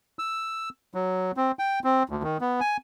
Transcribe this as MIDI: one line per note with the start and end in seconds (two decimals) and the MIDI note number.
0.19 0.69 88
0.94 1.32 54
1.37 1.52 60
1.59 1.79 79
1.84 2.03 60
2.10 2.23 38
2.23 2.38 51
2.41 2.60 59
2.60 2.77 80